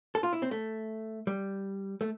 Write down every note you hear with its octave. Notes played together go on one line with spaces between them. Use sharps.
A4
F4
E4
C4
A3
G3
A3